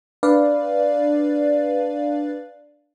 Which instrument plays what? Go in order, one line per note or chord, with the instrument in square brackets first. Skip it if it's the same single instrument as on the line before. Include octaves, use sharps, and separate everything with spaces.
[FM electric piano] D4 B4 D5 F5